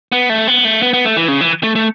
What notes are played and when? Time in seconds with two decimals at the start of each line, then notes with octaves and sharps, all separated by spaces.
0.12 B3
0.30 A3
0.48 B3
0.65 A3
0.82 B3
0.93 B3
1.05 A3
1.17 E3
1.28 C#3
1.41 E3
1.63 A3
1.75 A3